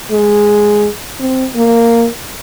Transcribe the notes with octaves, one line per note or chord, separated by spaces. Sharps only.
G#3
C4
A#3